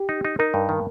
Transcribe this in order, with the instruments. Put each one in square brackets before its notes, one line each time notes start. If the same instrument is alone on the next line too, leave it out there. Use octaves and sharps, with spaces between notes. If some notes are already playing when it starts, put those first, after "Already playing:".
Already playing: [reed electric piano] G4
[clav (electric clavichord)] D#4
D#4
[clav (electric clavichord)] D#4 [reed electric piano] A#4
[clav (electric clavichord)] G2
D#3